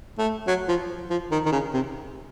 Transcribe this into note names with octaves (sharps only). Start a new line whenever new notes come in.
A3
F#3
F3
F3
D#3
D#3
C#3
C3